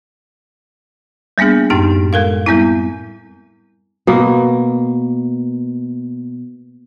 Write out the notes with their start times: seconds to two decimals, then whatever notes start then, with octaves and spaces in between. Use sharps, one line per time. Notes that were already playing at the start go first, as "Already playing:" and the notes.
1.38 G3 A#3 B3 D4 G#4
1.70 F#2 A2 D#4 G4 C6
2.13 G#3 A4 A#4 F5
2.46 G3 B3 C4 E4
4.07 B2 A#3